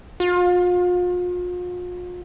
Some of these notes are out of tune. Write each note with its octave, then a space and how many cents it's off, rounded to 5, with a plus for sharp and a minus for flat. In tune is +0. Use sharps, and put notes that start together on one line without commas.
F4 +40